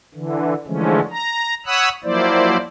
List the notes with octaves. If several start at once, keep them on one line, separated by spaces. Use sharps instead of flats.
D3 E3
D3 E3 F3 G#3 A3 C#4
A#5
C#5 F#5 B5 D#6 E6 F#6
F3 F#3 A#3 E4 C5 D5